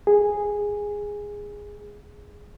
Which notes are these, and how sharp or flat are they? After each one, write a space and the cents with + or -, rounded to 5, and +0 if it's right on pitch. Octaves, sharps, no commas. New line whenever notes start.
G#4 -10